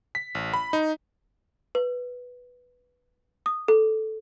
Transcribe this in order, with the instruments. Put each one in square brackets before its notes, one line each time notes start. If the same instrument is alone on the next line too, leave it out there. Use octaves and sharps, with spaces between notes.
[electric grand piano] B6
A1
B5
D#4
[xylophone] B4
D#6
A4